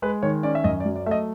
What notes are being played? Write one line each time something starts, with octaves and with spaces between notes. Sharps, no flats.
G#3 B4
D#3 C#5
C#4 D5
E5
F#2 D#5
D5
F#3
D5
A3 D#5 E5